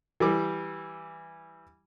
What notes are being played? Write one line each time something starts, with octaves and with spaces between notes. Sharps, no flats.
E3 G3 D6